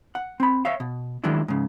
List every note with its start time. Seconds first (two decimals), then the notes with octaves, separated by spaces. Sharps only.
0.15 F#5
0.40 C4 B5
0.65 C#5 E5 F5
0.80 B2
1.24 D#3 F#3 G#3 D4 E4
1.48 G#2 C#3